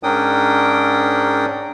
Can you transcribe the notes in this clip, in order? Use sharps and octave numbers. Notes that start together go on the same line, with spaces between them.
G#2 C#4 D4 A#4 G5 D#6